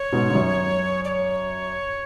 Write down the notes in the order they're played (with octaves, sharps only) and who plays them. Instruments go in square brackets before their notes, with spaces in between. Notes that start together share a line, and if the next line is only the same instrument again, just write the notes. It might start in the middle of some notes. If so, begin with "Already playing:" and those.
Already playing: [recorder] C#5
[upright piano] G#2 B2
G#2
F#2
[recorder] D5
C#5